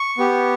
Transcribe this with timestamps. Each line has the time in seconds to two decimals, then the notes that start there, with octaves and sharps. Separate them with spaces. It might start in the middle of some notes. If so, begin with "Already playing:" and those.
Already playing: C#6
0.18 B3 G4